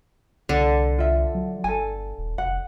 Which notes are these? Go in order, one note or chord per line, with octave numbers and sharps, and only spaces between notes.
C2 D3
F4 E5
F#3
G1 A4 G#5
D#1
F1 F#5